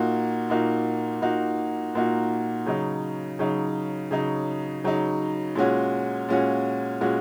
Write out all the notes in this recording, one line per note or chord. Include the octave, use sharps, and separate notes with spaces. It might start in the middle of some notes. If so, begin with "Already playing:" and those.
Already playing: A#2 A#3 D#4 F#4
A#2 A#3 D#4 F#4
A#2 A#3 D#4 F#4
A#2 A#3 D#4 F#4
C#3 F#3 D#4
C#3 F#3 D#4
C#3 F#3 D#4
C#3 F#3 D#4
A#2 G#3 C#4 F#4
A#2 G#3 C#4 F#4
A#2 G#3 C#4 F#4